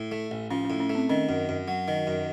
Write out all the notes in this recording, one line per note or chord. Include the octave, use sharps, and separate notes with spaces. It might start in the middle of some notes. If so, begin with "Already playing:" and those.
Already playing: A2
A3
A1
F3 C#4
A2 C#4
C#4
A3
C4
D#3 C#4
F#2
F#2
F#3
D#3
F#2